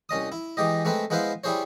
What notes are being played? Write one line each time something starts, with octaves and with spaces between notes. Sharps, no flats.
C2 C#4 D#5 D#6
E4
E3 G#3 G4 D#5
G#3 A3 C4 B4
G#3 B3 E4 B4 C5 F5
G3 E4 G#4 C5 C#5